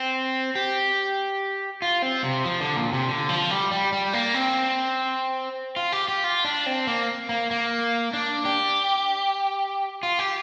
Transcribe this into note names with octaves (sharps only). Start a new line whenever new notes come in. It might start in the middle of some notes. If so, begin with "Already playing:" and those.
Already playing: C4
G4
F4
C4
C3
F3
D3
A#2
C3
D3
F3
G3
G3
G3
A#3
C4
F4
G4
G4
F4
D4
C4
A#3
A#3
A#3
D4
G4
F4
G4